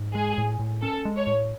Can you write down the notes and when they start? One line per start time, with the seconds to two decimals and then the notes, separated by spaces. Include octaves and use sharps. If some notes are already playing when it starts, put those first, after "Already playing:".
Already playing: G#2
0.15 G#3 G#4
0.38 A2
0.59 A2
0.82 C#4 A4
1.05 G#3
1.16 C#5
1.27 A2